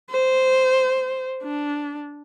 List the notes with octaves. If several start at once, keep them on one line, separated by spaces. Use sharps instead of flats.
C5
D4